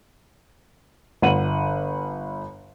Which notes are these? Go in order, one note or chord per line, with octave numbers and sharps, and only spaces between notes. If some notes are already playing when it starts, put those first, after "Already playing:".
G1 F#5 D#7 F#7